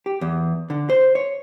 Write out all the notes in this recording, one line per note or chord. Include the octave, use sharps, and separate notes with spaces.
G4
E2
D3
C5
C#5